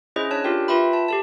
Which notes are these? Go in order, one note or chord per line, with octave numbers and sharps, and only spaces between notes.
C#4 E4 G#4 C5 D#5
D4 C#5 A5 F#6
F4 G4 A#4 G5
F4 B4 E5 G5 B5
A5
G4 A4 A5